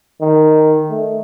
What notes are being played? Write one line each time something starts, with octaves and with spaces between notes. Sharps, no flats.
D#3
A3